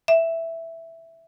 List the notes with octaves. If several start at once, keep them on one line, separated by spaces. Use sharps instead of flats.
E5